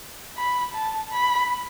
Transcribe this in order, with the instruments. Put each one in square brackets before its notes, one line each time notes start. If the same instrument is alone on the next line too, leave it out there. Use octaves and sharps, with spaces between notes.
[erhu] B5
A5
B5